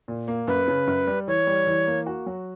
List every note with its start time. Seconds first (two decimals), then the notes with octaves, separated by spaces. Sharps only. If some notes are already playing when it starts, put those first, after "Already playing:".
0.08 A#2
0.28 A#3
0.48 F#2 B4
0.68 C#3
0.87 F#2
1.07 G3
1.28 E3 C#5
1.47 G3
1.67 E3
1.87 A#3
2.06 F#4
2.26 F#3